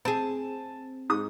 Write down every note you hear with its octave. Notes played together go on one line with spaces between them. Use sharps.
C4 G#4 A5
G#2 D#6